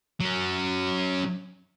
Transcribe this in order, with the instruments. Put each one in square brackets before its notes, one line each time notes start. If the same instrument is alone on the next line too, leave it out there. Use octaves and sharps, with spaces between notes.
[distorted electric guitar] F#3 C#4